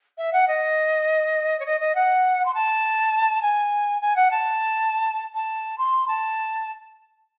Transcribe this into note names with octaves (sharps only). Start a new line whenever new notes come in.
E5
F#5
D#5
C#5
D#5
D#5
F#5
C6
A5
G#5
G#5
F#5
A5
A5
C6
A5